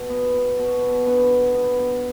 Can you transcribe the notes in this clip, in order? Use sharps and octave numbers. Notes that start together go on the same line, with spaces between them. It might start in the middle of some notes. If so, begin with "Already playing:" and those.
Already playing: B2
B3
B3
B2
B2
D3 B3 B4
D3
B3
B3